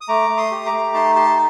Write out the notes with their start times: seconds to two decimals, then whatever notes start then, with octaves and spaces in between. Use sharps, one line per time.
0.01 D#6
0.08 A3 A#5 D6
0.30 A3
0.37 C6 D#6
0.51 G4
0.66 A#5 D6
0.72 A3
0.94 D#4 A5 C6
1.16 G4 A5 C6